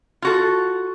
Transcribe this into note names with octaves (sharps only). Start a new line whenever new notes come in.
F4 F#4 A4